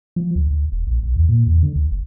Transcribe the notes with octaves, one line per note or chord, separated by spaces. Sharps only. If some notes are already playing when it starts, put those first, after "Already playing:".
F3
D2
D2
E1
A#1
B1
E2
A#2
E2
D3
D2
F#1